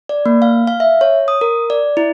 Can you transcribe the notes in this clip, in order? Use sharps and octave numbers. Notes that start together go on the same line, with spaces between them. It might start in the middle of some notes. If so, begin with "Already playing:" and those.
D5
A#3
F5
F5
E5
C#5
D#6
A#4
D5
E4